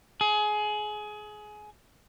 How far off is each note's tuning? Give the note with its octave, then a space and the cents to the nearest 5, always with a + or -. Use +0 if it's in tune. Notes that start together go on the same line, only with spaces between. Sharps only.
G#4 +25